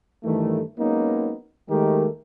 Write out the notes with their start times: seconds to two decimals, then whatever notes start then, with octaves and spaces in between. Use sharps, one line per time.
0.24 G2 D#3 E3 A3
0.79 F#3 G#3 A#3 B3 C#4 D#4
1.69 D#2 D#3 G#3 A3 G4 A#4